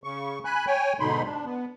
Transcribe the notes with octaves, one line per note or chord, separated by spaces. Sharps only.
C#3 C#6
G#5 B5 F#6
C#5 G5 G#5
G#2 B2 D3 D#4 B5 C6
D4
B3